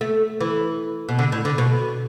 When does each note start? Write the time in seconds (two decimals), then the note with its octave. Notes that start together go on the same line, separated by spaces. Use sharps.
0.01 A3
0.41 E3
1.09 B2
1.19 D3
1.32 A2
1.45 D3
1.58 B2